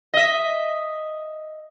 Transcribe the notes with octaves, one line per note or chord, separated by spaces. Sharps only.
D#5 E5